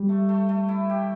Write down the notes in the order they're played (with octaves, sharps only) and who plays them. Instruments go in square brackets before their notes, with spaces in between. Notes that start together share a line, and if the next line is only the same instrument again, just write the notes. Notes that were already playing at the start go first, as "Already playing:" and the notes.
Already playing: [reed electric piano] G3
[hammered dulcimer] A3
A3
A3
E4
G4